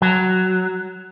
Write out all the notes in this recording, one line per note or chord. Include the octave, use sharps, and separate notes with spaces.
F#3